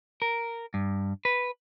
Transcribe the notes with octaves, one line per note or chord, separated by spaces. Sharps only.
A#4
G2
B4